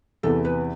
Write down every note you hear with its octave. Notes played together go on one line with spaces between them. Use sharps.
E2 C3 E3 A4
B4